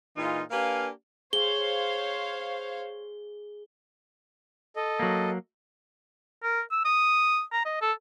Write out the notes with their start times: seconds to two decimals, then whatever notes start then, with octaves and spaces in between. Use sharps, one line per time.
0.17 A#2 E3 G#3 D#4 F4
0.50 A#3 D4 G4 B4 F5 G#5
1.33 G#4 C5 C#5 F5 G7
4.76 A4 D#5
4.99 F#3 A#3
6.43 A#4
6.71 E6
6.85 D#6
7.53 A#5
7.65 D#5
7.81 A4